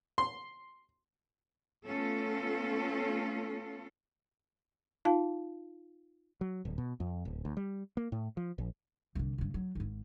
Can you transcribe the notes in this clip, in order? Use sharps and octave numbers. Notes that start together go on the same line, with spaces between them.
C6
A3 B3 C#4 F4 A4
D#4 F4 F5 A5
F#3
D1
B2
F2
D1
D2
G3
A#3
A2
F3
A#1
C2 D3
G2 C#3
F#3
G#1 G#2